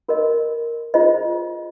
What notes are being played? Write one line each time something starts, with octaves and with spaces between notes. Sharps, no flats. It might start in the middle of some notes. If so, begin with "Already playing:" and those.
F#4 A#4 D#5
F4 G#4 C5 D#5